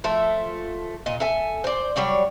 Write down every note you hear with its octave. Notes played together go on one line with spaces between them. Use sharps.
F3 A3 E5
A#2 D#5
A4 E5 G#5
C5 D5
F#3 G3 C#5 D5